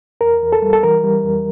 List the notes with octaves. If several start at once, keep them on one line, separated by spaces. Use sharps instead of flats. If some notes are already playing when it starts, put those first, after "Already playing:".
E2 A#4
E2
A4
G3
A4
E3 A#4
G3
F2